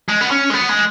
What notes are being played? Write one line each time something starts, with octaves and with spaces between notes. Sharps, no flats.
G#3
B3
C#4
G#3
B3
G#3